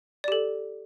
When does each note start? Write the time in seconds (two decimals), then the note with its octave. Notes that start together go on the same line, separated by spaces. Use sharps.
0.24 D5
0.28 G4
0.32 A4